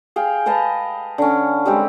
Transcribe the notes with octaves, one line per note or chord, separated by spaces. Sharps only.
G#4 F5 G5
B4 D#5 F5 A5
D3 C#4
G3 G#3 C4 G4